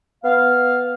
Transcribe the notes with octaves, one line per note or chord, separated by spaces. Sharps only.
B3 F5